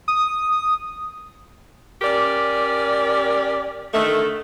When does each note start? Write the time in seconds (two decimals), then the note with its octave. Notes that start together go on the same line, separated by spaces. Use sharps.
0.08 D#6
2.02 C#4 G4 A#4 D5
3.93 D3 D#3 A3